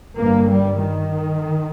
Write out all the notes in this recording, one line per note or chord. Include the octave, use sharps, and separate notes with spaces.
G1 G2 A#3
G3
D#3